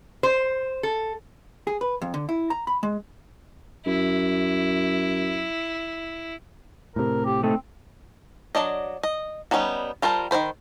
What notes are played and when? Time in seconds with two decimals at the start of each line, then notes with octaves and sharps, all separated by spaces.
0.23 C5
0.83 A4
1.67 G#4
1.81 B4
2.02 F2
2.14 D3
2.29 E4
2.50 A#5
2.67 B5
2.83 G#3
3.86 F#2 E4
6.96 A2 C3 A#4
7.25 G4
7.43 A3 C4 D#4 A4
8.55 F#3 D4 D5 D#5
9.03 D#5
9.51 G3 B3 C#4 D#4 F#4
10.02 G3 F4 A#4 C5 A5
10.31 D#3 F3 C5 B5